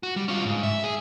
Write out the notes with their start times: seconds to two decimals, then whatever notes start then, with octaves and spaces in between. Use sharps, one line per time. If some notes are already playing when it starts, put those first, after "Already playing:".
0.03 F#4
0.16 G3
0.28 C#4 F4
0.45 G#2
0.63 E5
0.84 G#4